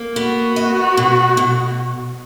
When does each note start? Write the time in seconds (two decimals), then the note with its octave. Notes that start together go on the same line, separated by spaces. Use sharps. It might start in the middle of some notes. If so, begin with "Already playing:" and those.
Already playing: A#3
0.16 B3 F#4
0.56 D#5
0.97 B2
1.37 B2